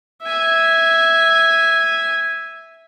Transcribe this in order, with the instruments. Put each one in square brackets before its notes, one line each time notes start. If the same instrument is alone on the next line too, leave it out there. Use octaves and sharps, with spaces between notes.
[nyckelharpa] E5 G#5